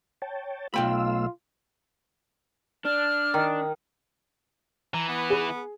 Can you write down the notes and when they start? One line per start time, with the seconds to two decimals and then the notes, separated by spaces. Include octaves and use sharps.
0.22 C#5 G5 A5
0.74 B1 A3 F4 F5 G5 B5 E6
2.85 D4 F6
3.34 D#3
4.94 E3 A#5
5.08 B3
5.30 G#4